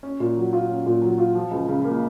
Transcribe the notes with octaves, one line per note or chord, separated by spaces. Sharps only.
C#4
A#2
F#3
F4
C#4
A#2
F#3
F4
F3
C#2
C#3
A#3